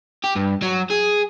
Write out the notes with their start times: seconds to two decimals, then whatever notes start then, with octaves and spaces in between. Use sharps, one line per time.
0.24 G4
0.36 G2
0.63 F#3
0.90 G#4